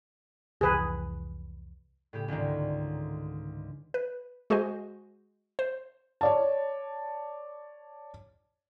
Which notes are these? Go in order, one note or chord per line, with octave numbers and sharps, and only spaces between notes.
F1 C2 E3 G#4 B4
A2 C#3 G4
C#2 G#2 D3 D#3
B4
G#3 F#4 G#4 C5 D#5 G#5
C5
C#5 D5 A5